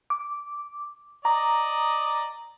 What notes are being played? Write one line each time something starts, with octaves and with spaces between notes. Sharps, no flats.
D6
D5 D#5 A#5